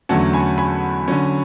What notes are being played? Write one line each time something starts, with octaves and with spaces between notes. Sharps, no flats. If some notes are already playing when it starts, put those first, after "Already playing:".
E2 D3 F#3 A3 C#4 F#5 A5
G#5 B5
G#5 B5
D3 F#3 C#4